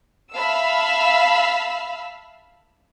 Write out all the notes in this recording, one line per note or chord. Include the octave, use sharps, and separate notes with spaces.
E5 F5 A5 B5 E6